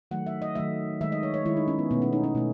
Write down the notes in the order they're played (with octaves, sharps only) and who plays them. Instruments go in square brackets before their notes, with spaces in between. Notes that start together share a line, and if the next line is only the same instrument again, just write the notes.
[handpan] D#3 F#3 A3 F#5
E5
D#5
D#3 F#3 A3 E5
D#3 G#3 E5
D#5
C#5
C#5
D#3 G#3 E4
D#4
C#4
B3
B2 A3 B3
C#4
D#4
C#4
B2 A3